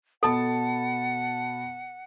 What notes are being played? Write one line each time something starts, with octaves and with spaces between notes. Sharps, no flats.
B2 A4 F#5 A5 B5